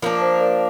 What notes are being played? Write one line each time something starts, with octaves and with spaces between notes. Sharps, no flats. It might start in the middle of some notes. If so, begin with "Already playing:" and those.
F3 A#3 D4 A#4
C5
A#4 D5